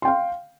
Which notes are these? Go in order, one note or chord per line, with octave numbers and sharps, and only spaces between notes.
F5 G5 C6